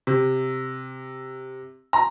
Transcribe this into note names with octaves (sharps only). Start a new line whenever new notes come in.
C3
A#5